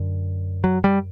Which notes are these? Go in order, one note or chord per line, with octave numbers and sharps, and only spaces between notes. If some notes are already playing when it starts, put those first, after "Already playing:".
Already playing: F#2 D3
F#3
G3